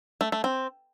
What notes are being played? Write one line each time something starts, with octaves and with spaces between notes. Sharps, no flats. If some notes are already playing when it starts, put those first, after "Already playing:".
A3
A3
C4